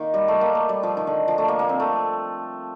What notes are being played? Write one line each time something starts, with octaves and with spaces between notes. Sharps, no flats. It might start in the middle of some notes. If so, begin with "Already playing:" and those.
Already playing: D#3 A#3
G3
A3
A#3
A3
G3
F3
D#3
D3
F3
A3
A#3
A#3
C4
A3